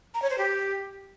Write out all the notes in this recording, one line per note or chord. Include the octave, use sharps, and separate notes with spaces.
A#5
C#5
C5
G4